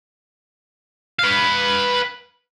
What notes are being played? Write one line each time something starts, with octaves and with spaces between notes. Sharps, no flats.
B4 F5